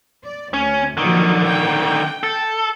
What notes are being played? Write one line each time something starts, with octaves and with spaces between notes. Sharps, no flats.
D5
D2 C#4
A#2 D3 D#3 F3 F#3
G5
A4